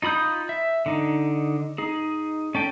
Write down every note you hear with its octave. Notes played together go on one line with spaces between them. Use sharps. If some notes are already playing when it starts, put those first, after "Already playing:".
D#4 F4 B5 D#6 G6
E5
D3 D#4
D#4 G#4
C#4 A4 G5